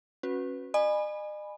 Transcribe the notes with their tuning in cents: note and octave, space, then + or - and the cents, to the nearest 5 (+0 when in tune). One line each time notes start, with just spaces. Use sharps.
C#4 -25 F#4 -15 B4 +0
D#5 -45 G#5 +0 B5 +0